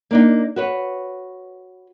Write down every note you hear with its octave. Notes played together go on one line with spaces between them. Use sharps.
A#3 D4 D#4
F#4 B4 C#5